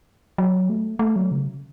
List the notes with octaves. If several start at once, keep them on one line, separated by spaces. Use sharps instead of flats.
F#3
A3
A3
F#3
C#3